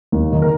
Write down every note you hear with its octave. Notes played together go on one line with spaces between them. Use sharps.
D#2
D#3
A#4